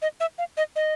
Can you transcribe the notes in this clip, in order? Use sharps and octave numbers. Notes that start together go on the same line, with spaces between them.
D#5
E5
F5
D#5
D#5